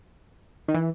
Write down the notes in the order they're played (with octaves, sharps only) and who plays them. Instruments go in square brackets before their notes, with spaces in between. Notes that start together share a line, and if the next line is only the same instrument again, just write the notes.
[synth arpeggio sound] D#3
E3